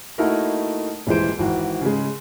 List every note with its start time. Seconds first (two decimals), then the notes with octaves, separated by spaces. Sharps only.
0.18 A3 A#3 D#4 E4 F#4 A#4
1.07 D#1 E3 G#3 C5 D7
1.39 G#1 E3 F#4
1.81 C#3 G#3